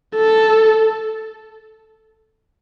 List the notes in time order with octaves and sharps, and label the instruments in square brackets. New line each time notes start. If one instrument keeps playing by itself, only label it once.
[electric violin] A4